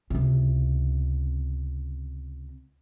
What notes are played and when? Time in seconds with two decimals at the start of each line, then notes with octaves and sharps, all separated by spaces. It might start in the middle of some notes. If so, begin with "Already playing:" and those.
0.10 C#2 C3